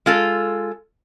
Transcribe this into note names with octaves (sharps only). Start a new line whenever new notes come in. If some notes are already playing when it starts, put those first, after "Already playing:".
G#3 F4 A4